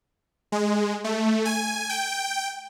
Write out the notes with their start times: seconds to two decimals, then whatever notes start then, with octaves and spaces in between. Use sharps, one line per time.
0.52 G#3
1.04 A3
1.45 G#5
1.89 G5